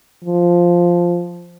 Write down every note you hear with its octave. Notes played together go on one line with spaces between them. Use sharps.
F3